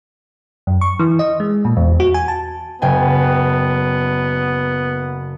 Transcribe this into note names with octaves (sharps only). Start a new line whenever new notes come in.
F#2
C#6
E3
D#5
G#3
A#2
E2
F#4
G#5
A5
F#1 B3 G5 G#5